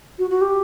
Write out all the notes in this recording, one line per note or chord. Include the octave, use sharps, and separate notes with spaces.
F#4
F#4
G4